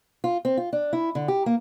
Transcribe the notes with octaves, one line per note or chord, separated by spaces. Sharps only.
F4
C4
F4
D4
E4
D3
G4
A#3